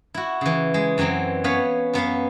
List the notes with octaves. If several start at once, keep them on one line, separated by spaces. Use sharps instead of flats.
E4 F#4
C#3 E3
G#3
F#2 E3 F#3 C4
B3 C#4 B4 C#5 F5 B5
F#2 B3 B4 F5